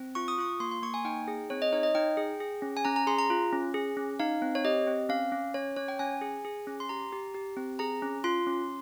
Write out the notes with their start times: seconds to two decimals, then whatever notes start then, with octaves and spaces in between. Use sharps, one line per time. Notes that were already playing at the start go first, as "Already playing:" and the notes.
Already playing: C4
0.15 F4 C#6
0.28 D#6
0.38 F4 C#6
0.60 A#3 C6
0.71 C6
0.82 A#3 C#6
0.94 G#5
1.05 D#4 G5
1.28 G#4
1.50 C4 C#5
1.62 D#5
1.72 D#4 C#5
1.83 D#5
1.95 D#4 G5
2.17 G#4
2.40 G#4
2.62 C#4
2.77 G#5
2.85 C#4 A#5
2.96 A#5
3.07 G#4 C6
3.19 A#5
3.30 F4
3.53 C#4
3.74 G#4
3.97 C#4
4.20 D#4 F5
4.42 C4
4.55 C#5
4.65 G4 D#5
4.87 C4
5.09 C#4 F5
5.32 C#4
5.54 C#4 C#5
5.76 C#4 C#5
5.88 G5
5.99 C#4 G#5
6.21 G#4
6.45 G#4
6.67 C#4
6.80 C6
6.89 G4 A#5
7.12 G4
7.35 G4
7.57 C4
7.79 G#4 A#5
8.02 C#4
8.24 F4 C6
8.47 C#4